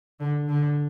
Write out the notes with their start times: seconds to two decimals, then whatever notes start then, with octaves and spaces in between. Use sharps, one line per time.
0.20 D3
0.48 D3